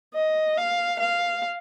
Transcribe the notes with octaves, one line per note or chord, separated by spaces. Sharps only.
D#5
F5
F5